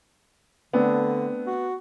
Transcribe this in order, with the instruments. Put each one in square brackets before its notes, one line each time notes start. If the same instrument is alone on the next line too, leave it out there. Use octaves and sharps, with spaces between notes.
[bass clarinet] D3 [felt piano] A3 C4 D4 [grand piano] B3
[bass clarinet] F#4